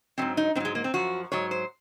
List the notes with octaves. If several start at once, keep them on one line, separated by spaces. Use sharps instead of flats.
G#2 D#3 F#3 C4
D#4
G#2 F#3 G#3 C4
A#3
C4
F#2 F3 F#4
G#2 F#3 C#5
C5